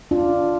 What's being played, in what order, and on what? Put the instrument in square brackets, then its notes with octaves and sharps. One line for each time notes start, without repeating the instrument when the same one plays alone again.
[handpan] D4 F4